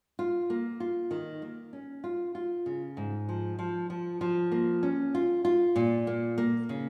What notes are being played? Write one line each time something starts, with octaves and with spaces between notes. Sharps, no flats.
F4
A#3
F4
D#3
A#3
C#4
F4
F4
C#3
G#2
F3
F3
F3
F3
A#3
C#4
F4
F4
A#2
A#3
A#3
C#3